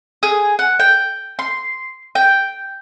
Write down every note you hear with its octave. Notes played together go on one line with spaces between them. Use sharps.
G#4
F#5
G5
C6
G5